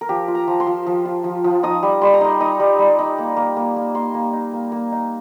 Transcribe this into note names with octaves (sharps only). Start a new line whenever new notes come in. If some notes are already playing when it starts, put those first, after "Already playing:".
A#4
F3 G4
F4
A#5
F3
C6
F3
F3
F4
F3
F3
D#4 D#6
G3
G3 C6
A#5
D#4 C6
D#4 D#6
G3
G3
D#4
A#3
A#3
A#3
A#3
A#3 C6
A#3
D#4
A#3
A#3
D#4